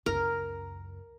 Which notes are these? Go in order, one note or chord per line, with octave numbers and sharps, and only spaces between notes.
C#2 F#2 A#4